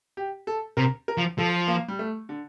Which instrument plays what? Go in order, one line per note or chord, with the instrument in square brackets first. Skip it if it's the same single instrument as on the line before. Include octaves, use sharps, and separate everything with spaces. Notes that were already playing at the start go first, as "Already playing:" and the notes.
[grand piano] G4
A4
[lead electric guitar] C3 [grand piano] A#4
[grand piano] A#4
[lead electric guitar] F3
[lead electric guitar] F3 [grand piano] A4
[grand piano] A#3
G3
A3
D3